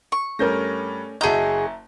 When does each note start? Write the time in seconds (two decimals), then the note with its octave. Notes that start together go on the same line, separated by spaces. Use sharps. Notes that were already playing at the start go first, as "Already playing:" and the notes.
0.12 C#6
0.39 G2 A3 C#4 A#4 G6 A#6
1.21 F#1 F#4 G#4 D#5 E5 A5 A#5 G6